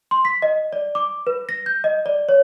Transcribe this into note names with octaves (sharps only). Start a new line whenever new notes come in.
C6
B6
D#5
D5
D6
B4
A#6
G6
D#5
D5
C#5